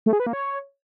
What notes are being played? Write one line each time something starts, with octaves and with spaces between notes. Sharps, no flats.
A3
G#4
B4
A#3
C#5